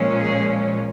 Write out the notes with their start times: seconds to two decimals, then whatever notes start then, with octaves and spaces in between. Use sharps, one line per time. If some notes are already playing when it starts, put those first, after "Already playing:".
Already playing: A#2 F3 G#3 C#4
0.21 G#4